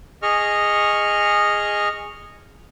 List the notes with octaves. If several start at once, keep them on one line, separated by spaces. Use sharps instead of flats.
G#4 D#5 C#6 F6